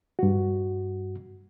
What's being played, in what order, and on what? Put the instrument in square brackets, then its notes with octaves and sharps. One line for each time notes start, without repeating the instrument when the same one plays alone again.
[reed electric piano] G2 F#4